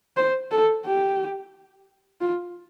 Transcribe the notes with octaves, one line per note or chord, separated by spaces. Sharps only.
C5
A4
G4
F4